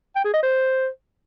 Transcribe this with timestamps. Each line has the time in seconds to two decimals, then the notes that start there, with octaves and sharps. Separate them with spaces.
0.16 G5
0.25 G#4
0.34 D#5
0.43 C5